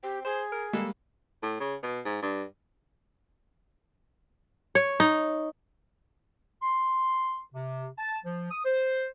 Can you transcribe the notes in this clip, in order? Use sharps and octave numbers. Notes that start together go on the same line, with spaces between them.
C4 G4
G#4 C5
A#4
G3 G#3 A#3 A4
A2
C#3
B2
G#2
G2
C#5
D#4
C6
C3
A5
F3
D#6
C5